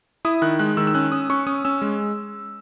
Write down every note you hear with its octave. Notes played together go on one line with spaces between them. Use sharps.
E4 D#6
D#3 F#6
G#3 F#6
D#3 E6
E6
C#4 F#6
C#4 D#6
C#4 C#6
C#4 D#6
C#4 E6
G#3